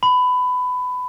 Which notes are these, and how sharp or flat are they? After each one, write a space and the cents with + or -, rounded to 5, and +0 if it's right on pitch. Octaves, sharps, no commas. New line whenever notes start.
B5 +20